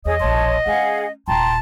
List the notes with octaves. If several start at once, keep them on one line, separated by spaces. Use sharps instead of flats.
E2 G#4 C#5 D#5 D#6
E1 A#1 C#5 A5 C6
G#3 C#4 G#4 F5 F#5
D#1 A#2 G5 A5 A#5 C6